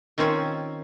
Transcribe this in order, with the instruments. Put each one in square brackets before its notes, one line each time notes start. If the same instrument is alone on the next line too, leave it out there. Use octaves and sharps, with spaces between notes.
[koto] D#3 C4 C#4 F4 C#5